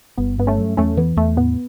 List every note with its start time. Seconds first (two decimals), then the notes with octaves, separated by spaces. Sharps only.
0.18 G1 B3
0.38 G2 B3
0.47 A3 C#4
0.58 F#3
0.77 E2 A3 C#4
0.97 E3 B3
1.17 E2 A3
1.37 A2 B3